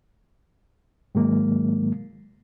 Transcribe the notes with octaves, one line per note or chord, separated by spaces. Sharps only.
G#2 D#3 F#3 G#3 A#3